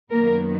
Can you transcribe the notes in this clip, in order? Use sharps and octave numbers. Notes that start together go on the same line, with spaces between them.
F#2 D#3 F#3 A#3 B3 A#4